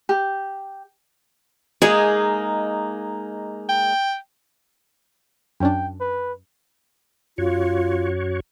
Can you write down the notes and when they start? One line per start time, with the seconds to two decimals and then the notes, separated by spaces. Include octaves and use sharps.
0.09 G4
1.82 G#3 A#3 D#4 G#4
3.69 G5
5.60 F#2 C#4 D4 G5
6.00 B4
7.38 F#2 F4 F#4 C#5